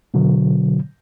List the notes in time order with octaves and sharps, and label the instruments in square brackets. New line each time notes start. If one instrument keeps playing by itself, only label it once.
[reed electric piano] B2 D3 F#3